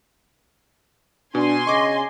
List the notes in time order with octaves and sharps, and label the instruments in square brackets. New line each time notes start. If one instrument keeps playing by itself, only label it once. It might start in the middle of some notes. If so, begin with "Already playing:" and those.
[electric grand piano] B2 [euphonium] D4 [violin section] G#5 C6
[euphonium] C#3 [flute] D#5 [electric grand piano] C#6 D6